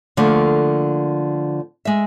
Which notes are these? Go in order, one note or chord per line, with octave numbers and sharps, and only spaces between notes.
D3 F3 A3 A#3
G#3 E5